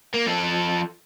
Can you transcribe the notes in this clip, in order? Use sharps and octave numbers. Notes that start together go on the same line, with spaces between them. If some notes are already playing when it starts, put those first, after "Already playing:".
A#3
F3 A4